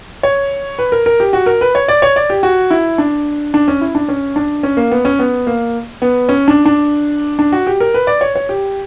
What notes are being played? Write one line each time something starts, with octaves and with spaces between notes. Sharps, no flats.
C#5
B4
A#4
A#4
G4
F#4
A#4
B4
C#5
D5
C#5
D5
G4
F#4
E4
D4
D4
C#4
E4
D4
C#4
D4
C#4
A#3
B3
C#4
B3
A#3
B3
C#4
D4
D4
D4
F#4
G4
A#4
B4
D5
C#5
C#5
G4